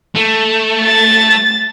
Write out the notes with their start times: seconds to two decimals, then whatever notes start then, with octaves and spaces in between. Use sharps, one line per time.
0.16 A3
0.83 A6